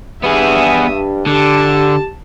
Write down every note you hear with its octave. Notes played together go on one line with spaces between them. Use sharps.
G2 B3 G#4 E5 D#6
D3 G4 A5